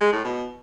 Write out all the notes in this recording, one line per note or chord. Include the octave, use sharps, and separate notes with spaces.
G#3
A2
B2